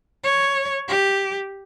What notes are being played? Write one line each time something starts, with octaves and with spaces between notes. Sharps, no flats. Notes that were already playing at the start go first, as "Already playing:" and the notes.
C#5
G4